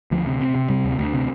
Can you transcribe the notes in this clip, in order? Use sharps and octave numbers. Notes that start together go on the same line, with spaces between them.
D2 F3
C3
C3
C3
C3 G3
D2
D2
C3